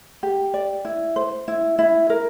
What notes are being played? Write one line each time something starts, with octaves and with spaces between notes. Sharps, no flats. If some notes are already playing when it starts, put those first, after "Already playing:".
G4
D5
E4
C5
E4
E4
A#4